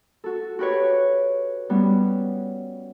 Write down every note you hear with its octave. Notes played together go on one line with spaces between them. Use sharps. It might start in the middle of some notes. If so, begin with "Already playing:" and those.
F#4 A4
F#4 G4 B4 C#5
G3 B3 C#4